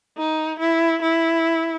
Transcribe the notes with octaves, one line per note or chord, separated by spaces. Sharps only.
D#4
E4
E4